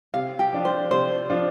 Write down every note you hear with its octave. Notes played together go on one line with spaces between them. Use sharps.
C3 F5
G4
F3 D4 F4
C5
C3 C5
F3 D4 F4